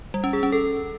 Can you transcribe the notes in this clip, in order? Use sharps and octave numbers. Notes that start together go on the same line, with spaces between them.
G3
C#4
G#4
C#4
A4